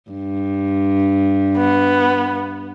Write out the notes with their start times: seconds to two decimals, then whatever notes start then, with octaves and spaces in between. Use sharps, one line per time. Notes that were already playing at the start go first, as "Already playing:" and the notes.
0.11 G2
1.57 B3